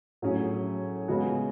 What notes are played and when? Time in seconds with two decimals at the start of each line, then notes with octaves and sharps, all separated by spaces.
0.22 A2 F#3 C#4 G#4
1.08 C#3 G#3 B3 F#4